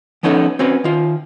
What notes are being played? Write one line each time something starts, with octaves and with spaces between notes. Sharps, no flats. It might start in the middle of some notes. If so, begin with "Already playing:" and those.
F3 B3 C#4 D#4 G#4 A4
C4 C#4 F#4 B4
D#3 F4